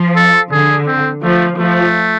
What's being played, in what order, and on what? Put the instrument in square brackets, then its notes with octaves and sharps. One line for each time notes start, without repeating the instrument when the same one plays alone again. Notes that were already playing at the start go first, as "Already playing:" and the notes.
Already playing: [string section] F3
[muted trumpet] A4
[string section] D3 [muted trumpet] G#4
[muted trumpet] C4
[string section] F3 [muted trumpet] A3
[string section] F3 [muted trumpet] A3